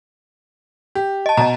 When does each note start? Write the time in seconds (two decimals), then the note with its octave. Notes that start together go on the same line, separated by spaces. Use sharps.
0.95 G4
1.26 D#5 A5
1.37 B2 D#5 A#5